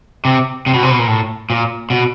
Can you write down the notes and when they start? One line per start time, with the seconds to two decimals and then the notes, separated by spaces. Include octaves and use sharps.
0.25 C3
0.66 C3
0.74 B2
0.83 C3
0.91 B2
0.99 A#2
1.08 A2
1.50 A#2
1.90 B2